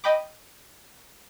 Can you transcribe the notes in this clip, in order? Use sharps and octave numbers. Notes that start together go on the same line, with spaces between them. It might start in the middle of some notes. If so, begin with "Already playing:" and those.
D#5 G5 B5 D6